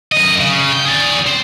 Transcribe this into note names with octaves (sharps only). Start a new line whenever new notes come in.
F#2 D#5
C#3
G5
G#4 D5
C4